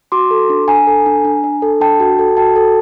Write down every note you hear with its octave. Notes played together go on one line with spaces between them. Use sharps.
F#4 C6 D6
A4
D4
D4 G#5 A#5
A4
D4
D4
D4
A4
D4 G5 A5
F#4
A4
F#4 G5 A5
A4